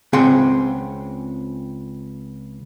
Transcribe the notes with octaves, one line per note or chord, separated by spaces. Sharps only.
C#2 C4 G#4 F#5 G5 C6